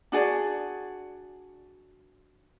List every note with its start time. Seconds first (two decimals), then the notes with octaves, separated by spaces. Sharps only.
0.12 D4 F#4 G#4 D5